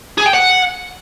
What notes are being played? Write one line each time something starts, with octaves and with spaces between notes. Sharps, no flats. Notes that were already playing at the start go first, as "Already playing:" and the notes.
G#4
G5
F#5